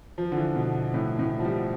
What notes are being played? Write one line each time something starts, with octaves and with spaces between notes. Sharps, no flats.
F3
D3
E3
B2
A2
A2
F3
G3